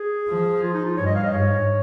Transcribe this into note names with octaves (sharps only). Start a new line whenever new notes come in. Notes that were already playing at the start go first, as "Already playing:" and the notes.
Already playing: G#4
F3
F4
D#4
F4
G2 C#5
D#5
F5
D#5
G#2 C#5